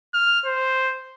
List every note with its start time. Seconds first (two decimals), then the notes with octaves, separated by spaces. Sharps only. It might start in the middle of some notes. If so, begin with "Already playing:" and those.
0.14 F6
0.46 C5